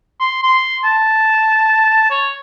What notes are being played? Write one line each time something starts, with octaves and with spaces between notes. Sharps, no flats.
C6
C6
A5
C#5